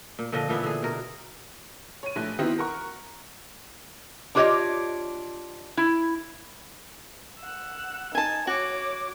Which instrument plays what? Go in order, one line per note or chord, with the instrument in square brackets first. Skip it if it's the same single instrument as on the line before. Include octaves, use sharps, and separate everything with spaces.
[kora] A#2
A#2 D3 F3 D#5
A#2 E3 B3 E4
D3 G#4
B2 A#4
[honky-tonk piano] C#5 D#7
A#1 A3 F#6
D#3 B3 C4 D#4 E4 F#4
A#4 F#5 C#6
[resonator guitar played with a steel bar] D4 F4 G4 C5 C#5 D#5
E4
[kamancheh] F#5 E6
[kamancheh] D#4 [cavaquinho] G#5 A5
[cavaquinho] F#4 [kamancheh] C#5 D6